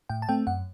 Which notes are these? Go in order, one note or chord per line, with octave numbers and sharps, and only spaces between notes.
A2 G5
A5
A3 C4 G5
F#2 F#5